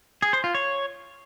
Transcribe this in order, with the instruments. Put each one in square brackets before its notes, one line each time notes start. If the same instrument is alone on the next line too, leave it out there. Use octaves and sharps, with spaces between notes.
[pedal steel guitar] G#4
C5
F4
C#5